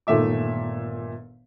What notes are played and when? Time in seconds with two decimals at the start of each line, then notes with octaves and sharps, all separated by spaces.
0.07 G1 A#2 D#3 A3 E5 D6